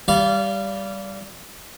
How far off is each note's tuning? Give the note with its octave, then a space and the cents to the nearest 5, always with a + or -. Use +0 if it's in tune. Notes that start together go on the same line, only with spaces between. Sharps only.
G3 +5 D5 -25 F5 -20